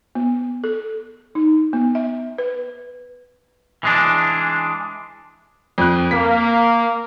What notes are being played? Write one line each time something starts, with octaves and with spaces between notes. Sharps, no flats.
B3
A4
D#4
B3
E5
B4
E3 G#3 D4
F2 F#6
A#3 B6